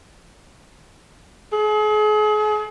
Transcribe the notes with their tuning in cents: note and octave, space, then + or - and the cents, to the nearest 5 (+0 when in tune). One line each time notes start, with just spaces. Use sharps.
G#4 +40